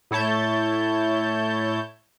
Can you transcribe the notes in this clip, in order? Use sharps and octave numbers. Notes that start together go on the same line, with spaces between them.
A2 E4 C#5 A5 G6